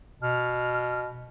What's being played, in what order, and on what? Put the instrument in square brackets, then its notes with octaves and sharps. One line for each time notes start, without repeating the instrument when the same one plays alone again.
[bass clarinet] B2 [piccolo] F6